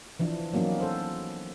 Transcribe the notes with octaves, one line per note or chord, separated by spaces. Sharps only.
E3 F3 D4
F#3 A#3 B3 C#4 D#4
A4 C5